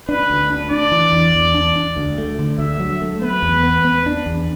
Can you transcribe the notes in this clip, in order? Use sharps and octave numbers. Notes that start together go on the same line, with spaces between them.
D4 B4
D2
D4
D4 D5
E3
E2
E2
D4
D4
D2
A3
D3
D2 E5
F#3
A3
B3 B4
E2
B3
B3
D4
E2